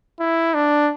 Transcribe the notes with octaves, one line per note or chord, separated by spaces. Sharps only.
E4
D4